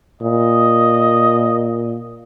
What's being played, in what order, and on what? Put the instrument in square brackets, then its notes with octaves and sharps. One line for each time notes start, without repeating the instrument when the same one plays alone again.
[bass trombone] A#2 [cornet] D#5